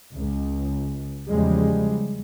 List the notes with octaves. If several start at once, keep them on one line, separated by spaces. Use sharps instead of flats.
C#2
E2 C#3 F3 G3 G#3